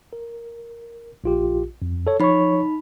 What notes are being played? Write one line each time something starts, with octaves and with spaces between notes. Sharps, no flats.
A#4
A#1 F4 G4
F2
A4 C#5
F3 D#4 C#5 B5 C#6